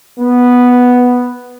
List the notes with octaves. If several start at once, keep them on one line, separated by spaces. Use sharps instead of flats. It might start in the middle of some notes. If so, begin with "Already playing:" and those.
B3